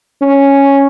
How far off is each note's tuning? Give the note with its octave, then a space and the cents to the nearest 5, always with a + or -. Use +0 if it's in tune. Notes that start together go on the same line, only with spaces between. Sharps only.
C#4 +0